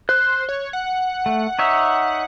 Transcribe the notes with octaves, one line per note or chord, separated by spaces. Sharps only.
C5 F#6
C#5
F#5
A3
D#4 C#5 E5